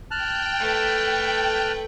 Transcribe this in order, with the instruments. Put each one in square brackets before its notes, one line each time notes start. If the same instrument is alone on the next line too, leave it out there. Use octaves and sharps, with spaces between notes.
[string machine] G5 [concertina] A5 F6 F#6
[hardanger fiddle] A3 B4